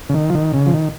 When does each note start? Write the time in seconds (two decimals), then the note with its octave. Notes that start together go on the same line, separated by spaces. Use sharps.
0.09 C#3
0.14 D#3
0.30 F3
0.34 D#3
0.54 C#3
0.66 F3
0.74 D#3